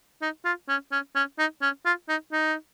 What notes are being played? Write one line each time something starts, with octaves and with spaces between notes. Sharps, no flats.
D#4
F4
C#4
C#4
C#4
D#4
C#4
F4
D#4
D#4